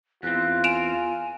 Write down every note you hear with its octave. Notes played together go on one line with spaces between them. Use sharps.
E2 C4 F4 F#6
G#5 D7 E7 F7